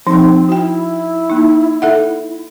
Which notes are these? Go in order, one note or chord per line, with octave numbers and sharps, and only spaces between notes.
F3 C4 D#4
E4 F#4 G5
A#3 D#4
A4 E5 F#5